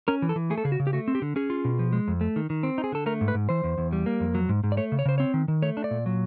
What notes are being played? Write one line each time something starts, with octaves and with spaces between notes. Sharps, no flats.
C#4 A#4
E3
A4
E3
A3 G#4
A4
C#3 G#4
F#4
C#3
G4
A3 F#4
C4
G4
D3
C#4 G#4
F4
B2
F3
G#3
F2
A3
D#3
D#3
C4
D#4
G#4
D3 A4
A3 A#4
G#2
B4
G#2
E3 C5
E2
E2
G3
A#3
F2
F#3
G#2
G#2
D5
A3 C#5
C#3
C#5
C#3 C5
C4 C#5
D#3
D#3
A3 C#5
D4
D5
A#2
F#3